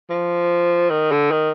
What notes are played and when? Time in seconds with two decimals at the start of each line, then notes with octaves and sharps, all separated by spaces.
0.10 F3
0.90 D#3
1.12 D3
1.31 D#3